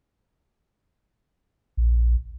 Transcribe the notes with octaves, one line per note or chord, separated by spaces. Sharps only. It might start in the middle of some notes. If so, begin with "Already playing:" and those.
A#1